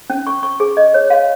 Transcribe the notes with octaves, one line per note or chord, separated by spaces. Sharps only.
C#4
C#6
C#6
G#4
D#5
C#5
F5